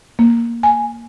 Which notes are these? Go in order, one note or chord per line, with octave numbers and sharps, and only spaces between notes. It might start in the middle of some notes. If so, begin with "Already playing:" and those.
A#3
G#5